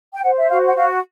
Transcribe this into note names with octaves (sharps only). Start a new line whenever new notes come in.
G5
C5 F#5
E5
F#4 F5
F#5
F#4 F5